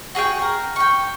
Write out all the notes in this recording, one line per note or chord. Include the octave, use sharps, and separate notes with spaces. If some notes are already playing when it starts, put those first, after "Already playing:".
F#4 G#4 C#5 G5
A#4
G5 C#6